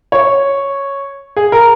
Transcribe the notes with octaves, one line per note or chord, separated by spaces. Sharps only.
C#5
G#4
A#4